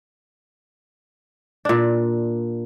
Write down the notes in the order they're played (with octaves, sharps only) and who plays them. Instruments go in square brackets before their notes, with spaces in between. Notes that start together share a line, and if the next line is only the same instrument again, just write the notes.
[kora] A#2 D4